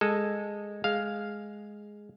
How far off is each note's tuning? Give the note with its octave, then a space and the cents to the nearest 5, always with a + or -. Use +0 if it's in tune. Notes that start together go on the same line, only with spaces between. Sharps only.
G#3 -10 A4 +0
G#3 +0 F5 +0